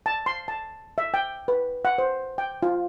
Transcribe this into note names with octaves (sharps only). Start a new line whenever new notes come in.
A5
C6
A5
E5
G5
B4
F#5
C5
G5
F4